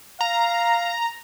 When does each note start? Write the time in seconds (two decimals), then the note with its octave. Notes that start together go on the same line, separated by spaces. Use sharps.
0.21 F5 A#5